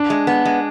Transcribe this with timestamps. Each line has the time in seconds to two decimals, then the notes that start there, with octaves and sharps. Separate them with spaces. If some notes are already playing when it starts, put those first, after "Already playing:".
Already playing: D4
0.10 G#3
0.27 B3
0.45 G#3